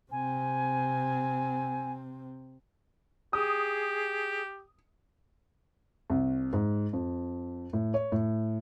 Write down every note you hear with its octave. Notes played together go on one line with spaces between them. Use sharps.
C3 C4 G#5
G4 G#4 D#6
C2
G#2
F2
A2
C#5
A2